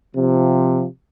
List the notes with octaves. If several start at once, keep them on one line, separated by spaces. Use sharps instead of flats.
C3 F3